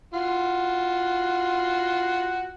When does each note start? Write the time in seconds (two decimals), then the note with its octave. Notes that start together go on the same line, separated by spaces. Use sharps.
0.14 F4 F#4